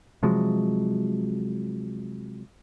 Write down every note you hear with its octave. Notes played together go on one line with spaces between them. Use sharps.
C3 F3 F#3 G#3